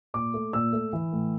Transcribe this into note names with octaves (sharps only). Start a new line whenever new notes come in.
A#2 D6
A3
A#2 E6
A3
E3
A2